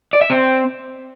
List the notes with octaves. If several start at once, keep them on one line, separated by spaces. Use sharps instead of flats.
D5
E5
C4